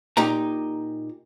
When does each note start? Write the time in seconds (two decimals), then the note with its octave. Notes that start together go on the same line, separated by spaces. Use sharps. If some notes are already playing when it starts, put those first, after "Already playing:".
0.17 A#2 D#4 G4 A#5